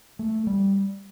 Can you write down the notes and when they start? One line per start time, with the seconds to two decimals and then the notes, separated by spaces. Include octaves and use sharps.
0.19 A3
0.47 G3